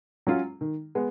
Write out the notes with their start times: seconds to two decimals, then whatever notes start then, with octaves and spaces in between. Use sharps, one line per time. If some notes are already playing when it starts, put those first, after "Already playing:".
0.27 F#3 C#4 F4
0.61 D#3
0.95 G#3 B3